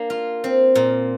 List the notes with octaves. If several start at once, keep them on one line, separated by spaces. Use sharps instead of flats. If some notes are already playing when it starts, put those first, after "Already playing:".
Already playing: A#3 D4
F4
C4
A#2